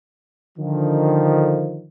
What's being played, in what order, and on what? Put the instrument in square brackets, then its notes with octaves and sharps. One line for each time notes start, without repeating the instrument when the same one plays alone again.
[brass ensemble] D3 D#3 F3